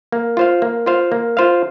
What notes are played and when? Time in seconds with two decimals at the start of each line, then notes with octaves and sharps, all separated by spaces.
0.12 A#3
0.37 F4 C5 F5
0.62 A#3
0.86 F4 C5 F5
1.12 A#3
1.37 F4 C5 F5